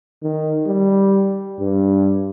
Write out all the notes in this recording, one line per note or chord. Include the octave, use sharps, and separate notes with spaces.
D#3
G3
G2